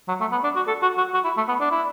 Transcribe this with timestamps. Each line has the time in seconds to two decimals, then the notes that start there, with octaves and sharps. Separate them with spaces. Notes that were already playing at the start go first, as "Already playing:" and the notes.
0.08 F#3
0.21 A3
0.32 B3
0.44 D4
0.56 F#4
0.67 A4
0.82 F#4
0.98 F#4
1.14 F#4
1.24 E4
1.37 A3
1.49 B3
1.60 D4
1.71 E4